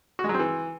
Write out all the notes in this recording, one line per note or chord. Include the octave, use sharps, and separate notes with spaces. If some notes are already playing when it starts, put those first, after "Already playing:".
F#4
G#3
F#3
C4
E3